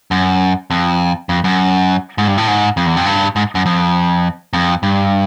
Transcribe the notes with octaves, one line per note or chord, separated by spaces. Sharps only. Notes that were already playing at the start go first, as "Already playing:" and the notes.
F#2
F2
F2
F#2
G#2
G2
A2
G#2
F2
E2
F2
G2
G#2
F#2
F2
F2
G2